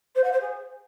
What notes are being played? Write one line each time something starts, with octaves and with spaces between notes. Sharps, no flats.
C5
F#5
C5
G#4